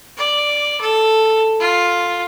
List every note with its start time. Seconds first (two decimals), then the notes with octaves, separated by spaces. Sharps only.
0.17 D5
0.81 A4
1.60 F4